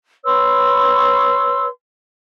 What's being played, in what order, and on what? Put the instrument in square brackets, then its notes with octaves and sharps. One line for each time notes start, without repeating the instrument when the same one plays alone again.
[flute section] B4 C#5 C6 E6